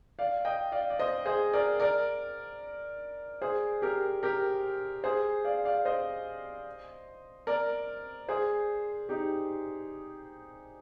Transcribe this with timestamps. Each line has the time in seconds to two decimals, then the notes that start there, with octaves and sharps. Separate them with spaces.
0.19 D5 F5
0.45 D#5 G5
0.72 D5 F5
0.90 D5
0.99 C5 D#5
1.26 G#4 C5
1.53 A#4 D5
1.80 A#4 D5
3.42 G#4 C5
3.82 G4 A#4
4.23 G4 A#4
5.04 G#4 C5
5.45 D5 F5
5.65 D5 F5
5.85 C5 D#5
7.47 A#4 D5
8.28 G#4 C5
9.09 D#4 G4